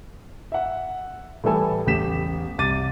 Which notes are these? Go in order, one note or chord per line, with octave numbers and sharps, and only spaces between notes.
E5 F#5
A2 E3 G3 A4 G#5
A1 E2 G4 B6 E7
C2 D6 A6 D#7